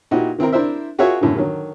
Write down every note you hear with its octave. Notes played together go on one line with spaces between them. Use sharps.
A#2 D#4 E4 F#4 G4
D#3 C4 E4 A#4
D4 E4 A#4 C5 E5
F4 F#4 G#4 A#4 C#5 E5
F#2 A2 D3
D3 D#3 F#3